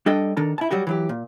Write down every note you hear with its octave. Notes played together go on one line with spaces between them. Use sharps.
G3 D4 A4 D#5 G5
D#3 D4 A4 A#5
E4 A5
F#3 G3 F#4 G4
E3 F#3 G4
A#2